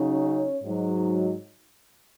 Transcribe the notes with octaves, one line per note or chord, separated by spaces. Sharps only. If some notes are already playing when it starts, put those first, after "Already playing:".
Already playing: C#3 F#3 D#4
C#4 C#5
G#2 F#3 D#4